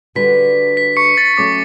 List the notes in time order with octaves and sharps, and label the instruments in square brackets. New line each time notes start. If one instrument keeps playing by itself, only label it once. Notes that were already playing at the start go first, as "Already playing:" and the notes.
[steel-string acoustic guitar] D3 G3 D4 F#4 B4 [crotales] B6
[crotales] B6
C#6 C#7
A6
[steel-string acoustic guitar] F#3 A3 C#4 [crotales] D6